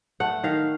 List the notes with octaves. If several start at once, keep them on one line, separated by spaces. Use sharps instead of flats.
A3 F#5
D#3 F5